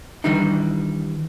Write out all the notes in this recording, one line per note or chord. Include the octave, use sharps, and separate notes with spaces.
D#3 E3 G3 D4 D#4